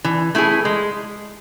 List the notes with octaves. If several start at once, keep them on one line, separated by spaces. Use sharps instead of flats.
E3
A3 E4 G#4
G#3